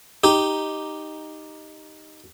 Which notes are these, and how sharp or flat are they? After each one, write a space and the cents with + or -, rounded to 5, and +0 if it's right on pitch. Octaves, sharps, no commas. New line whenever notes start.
D#4 +0 G4 +0